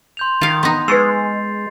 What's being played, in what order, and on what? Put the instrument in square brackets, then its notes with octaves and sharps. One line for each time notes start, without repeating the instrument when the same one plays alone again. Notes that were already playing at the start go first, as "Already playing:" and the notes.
[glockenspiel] C6 G6 F7
[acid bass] D#3 [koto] F4 F5
[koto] B3 D#4
[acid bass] G#3 [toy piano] B4 C#6 E6 [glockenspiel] A6 C7